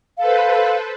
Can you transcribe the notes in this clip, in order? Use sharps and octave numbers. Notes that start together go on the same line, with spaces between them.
A4 B4 C5 F5